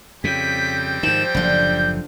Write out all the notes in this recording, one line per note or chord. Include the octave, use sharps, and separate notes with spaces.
F2 C#3 G3 C4 G5 B6
G#2 D#3 F3 E7
F#1 A2 D3 F3 F4 G6